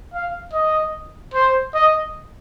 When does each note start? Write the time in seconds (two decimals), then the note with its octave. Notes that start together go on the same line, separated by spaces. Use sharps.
0.14 F5
0.53 D#5
1.34 C5
1.74 D#5